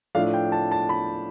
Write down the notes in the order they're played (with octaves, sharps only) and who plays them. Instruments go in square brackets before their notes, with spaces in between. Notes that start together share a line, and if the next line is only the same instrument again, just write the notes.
[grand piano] A2 F3 A3 D4 F5
G5
A5
A5
B5